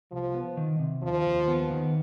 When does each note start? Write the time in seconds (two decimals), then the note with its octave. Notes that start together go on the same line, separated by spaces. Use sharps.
0.12 C2 F3
0.34 B3
0.57 D#3
0.79 C3
1.02 D#2 F3
1.26 D#2
1.48 B3
1.70 D#3